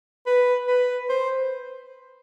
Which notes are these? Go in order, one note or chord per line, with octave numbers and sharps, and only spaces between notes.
B4
B4
C5